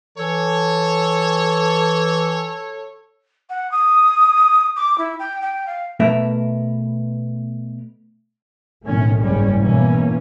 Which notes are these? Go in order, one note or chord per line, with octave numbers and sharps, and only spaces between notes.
E3 A4 C#5
F#5
D#6
D6
E4
G5
G5
F5
B2 A3 B3 A#4 E5
B1 A2 D#3 A3 C#4
F#1 G#2 G3 G#3 C#4
B2 E3 A#3 C#4